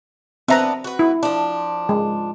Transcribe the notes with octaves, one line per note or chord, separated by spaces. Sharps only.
B3 C4 D4 B4 E5 A#5
F#4 B4
E4
F3 D4
G#3